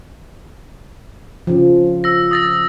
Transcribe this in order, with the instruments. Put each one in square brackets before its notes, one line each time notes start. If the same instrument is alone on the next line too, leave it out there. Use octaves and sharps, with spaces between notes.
[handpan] C#3 F3
[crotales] E6 A#6
D#6 A6 A#6